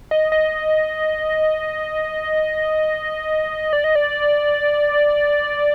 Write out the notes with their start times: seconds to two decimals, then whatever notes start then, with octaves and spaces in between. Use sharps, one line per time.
0.11 D#5
0.32 D#5
3.73 D5
3.84 D#5
3.95 D5